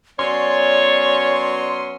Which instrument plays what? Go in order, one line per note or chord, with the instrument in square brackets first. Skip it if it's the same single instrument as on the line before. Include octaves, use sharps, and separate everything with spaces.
[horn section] F#3 B3 C#4 [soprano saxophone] C#5 [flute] D5 [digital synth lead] C6